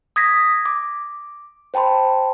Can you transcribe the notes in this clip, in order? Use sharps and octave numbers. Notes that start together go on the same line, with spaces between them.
D#6 G#6 A#6 B6
D6
C5 G5 A5 B5 C6